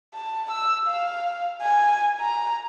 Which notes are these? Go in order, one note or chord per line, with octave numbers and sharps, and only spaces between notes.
A5
E6
F5
G#5
A#5